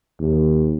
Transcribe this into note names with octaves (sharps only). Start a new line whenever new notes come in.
D#2